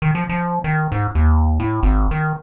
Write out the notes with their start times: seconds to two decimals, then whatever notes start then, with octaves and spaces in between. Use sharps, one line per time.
0.02 D#3
0.15 F3
0.29 F3
0.64 D#3
0.92 G#2
1.15 D#2
1.60 A2
1.83 G#1
2.11 D#3